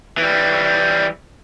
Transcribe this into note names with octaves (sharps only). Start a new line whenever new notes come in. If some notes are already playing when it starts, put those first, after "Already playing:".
E3 G3